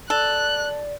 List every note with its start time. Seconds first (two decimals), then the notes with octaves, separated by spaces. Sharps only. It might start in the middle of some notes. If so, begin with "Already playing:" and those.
0.10 A4 D5 F#6